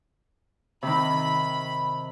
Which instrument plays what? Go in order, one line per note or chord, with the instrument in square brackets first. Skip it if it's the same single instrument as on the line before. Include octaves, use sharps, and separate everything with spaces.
[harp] C3 D#3 [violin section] B5